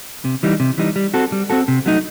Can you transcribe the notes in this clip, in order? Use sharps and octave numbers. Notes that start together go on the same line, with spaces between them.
C3
E3 G3 D#4
C3
E3 G3 D#4
G3
C4 F#4 A4
G3
C4 F#4 A4
C3
F#3 A3 D#4